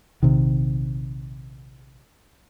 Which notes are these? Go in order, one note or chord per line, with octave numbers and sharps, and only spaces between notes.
A#1 C3 D#3